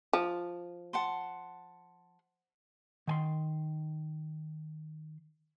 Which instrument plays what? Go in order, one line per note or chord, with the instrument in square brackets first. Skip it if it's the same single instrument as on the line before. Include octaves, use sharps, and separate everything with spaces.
[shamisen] F3
[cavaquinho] F#5 A5 C6
[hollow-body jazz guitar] D#3 G#5 C6